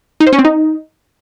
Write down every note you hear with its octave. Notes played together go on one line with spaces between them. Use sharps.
D#4
C5
C#4
C4
D#4